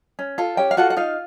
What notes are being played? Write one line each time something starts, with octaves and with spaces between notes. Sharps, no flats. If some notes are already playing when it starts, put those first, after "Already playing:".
C#4
F4 A4
C#4 G4 G5
F5
F4 F#4 A4 F#5
F#5
D#4 F4 F5